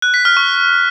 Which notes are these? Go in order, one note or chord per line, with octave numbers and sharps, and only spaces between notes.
F#6
B6
F6
C#6